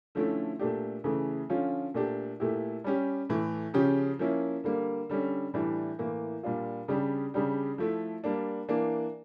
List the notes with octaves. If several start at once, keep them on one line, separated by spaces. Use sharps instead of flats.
D3 F3 A3 C#4 E4
A#2 A3 D4 G4
C#3 E3 A3
D3 F3 C#4 F4
A#2 A3 D4 G4
A#2 A3 E4 G4
G3 C#4 G4
A2 E3 A3
C#3 F3 C#4 G4
F3 A#3 C#4 E4
D3 G3 A#3
D3 G3 C#4
A2 E3 G3 D4
A2 E3 A#3
A#2 G3 D4 F4
C#3 G3 D4 G4
C#3 G3 D4 G4
F3 A3 E4
G3 A#3 D4
E3 A#3 D4